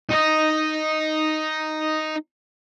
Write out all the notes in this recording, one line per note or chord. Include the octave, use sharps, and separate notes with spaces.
D#4 D#5